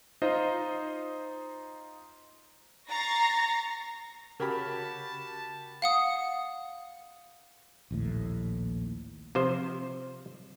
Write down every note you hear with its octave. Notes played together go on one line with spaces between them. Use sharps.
D#4 F4 C5 D#5
A#5 C#6 A6 A#6 C7
C#3 F#4 G4 A#4 A5 B5 F6 G#6
F5 F#5 D#6
A#1 D#2 A2
C3 F3 C5